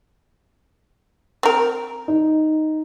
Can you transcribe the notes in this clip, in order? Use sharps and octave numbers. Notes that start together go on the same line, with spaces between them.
C4 A#4
D#4